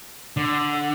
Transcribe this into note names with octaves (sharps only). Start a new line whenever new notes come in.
D3